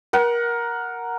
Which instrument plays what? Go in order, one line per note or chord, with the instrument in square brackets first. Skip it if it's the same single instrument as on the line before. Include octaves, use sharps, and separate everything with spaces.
[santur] A#4 F#5